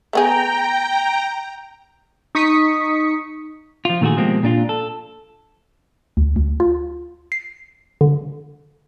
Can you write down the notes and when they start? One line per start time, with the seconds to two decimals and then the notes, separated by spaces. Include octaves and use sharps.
0.13 A3 B3 G#4 G5 A#5
2.35 D#4 C#6 D#6 B6 C#7
3.85 F3 F4
4.01 A#2 D#3 A3 F4 F#4 G#4
4.16 B2 F3 G#3 A#3 C4 G4
4.43 A#2 D4 F4
4.69 A4
6.17 D2
6.36 D2
6.60 F4
7.32 C7
8.01 D3